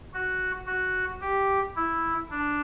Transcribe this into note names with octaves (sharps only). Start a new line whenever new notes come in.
F#4
F#4
G4
E4
D4